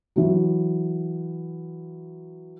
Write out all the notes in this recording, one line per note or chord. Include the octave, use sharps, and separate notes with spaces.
E3 F#3